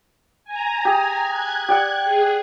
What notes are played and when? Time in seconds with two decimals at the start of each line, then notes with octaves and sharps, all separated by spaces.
0.44 G#5 A#5
0.85 G4 G#4
1.29 F#6 G#6
1.68 G4 D5 F#5
2.04 G#4